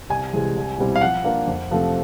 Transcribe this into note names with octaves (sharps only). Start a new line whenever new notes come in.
C2 G#5
C3 E3 G#3
C2
B2 G3 C4 E4
F5
F3 F#5
A#3 D4 F4 A#4
F2
C3 F3 A3 C4